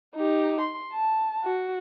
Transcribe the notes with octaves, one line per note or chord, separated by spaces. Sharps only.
D#4 G4
C6
A5
F#4